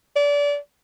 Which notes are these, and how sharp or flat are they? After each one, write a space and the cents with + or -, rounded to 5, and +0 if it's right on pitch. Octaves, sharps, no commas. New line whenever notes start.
D5 -30